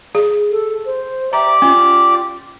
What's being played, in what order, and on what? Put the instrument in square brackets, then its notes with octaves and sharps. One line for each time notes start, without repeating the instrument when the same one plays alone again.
[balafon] G#4
[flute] A4
C5
[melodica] G4 D5 D6 [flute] E5 [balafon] A#5
[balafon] C#4 [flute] F4